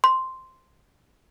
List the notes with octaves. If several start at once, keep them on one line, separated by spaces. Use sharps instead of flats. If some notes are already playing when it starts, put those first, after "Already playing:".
C6